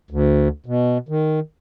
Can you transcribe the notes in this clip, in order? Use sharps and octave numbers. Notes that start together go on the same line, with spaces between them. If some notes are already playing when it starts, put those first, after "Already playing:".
D2
B2
D#3